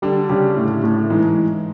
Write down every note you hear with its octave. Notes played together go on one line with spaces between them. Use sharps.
D3 G3 D4
C#3 G3 C#4
A2
A2
G#2 E3 G#3